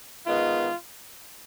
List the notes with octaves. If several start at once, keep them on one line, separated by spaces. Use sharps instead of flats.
D#3 G#3 B3 F4